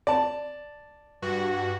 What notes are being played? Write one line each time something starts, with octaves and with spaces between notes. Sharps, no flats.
D5 A5
G2 F#4